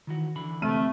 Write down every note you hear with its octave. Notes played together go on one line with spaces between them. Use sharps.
D#3 E3 F#4
D3 E3 B5
C3 A3 F6 D#7